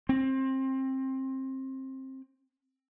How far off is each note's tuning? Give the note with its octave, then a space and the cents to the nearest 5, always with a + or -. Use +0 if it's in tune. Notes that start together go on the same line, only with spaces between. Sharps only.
C4 +20